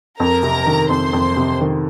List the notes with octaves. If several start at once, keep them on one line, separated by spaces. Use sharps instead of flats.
F2 A#4 A#5
C3
D#3
F2 C5 C6
F2
C3
D#3